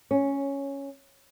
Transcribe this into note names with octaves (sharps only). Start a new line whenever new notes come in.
C#4